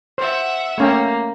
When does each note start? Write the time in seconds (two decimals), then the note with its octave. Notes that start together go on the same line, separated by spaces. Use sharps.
0.18 C5 E5 F#5
0.78 A3 A#3 C#4 G5